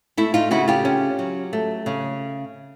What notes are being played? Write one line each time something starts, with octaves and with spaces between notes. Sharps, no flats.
A3 E4
D#4 F4
C#3 E4 F#4
F4 G4
C#4
F#3
A3
C#3